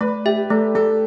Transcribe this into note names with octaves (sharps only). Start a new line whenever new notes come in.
A3 B4
G4 E5
A3 A4
A3 A4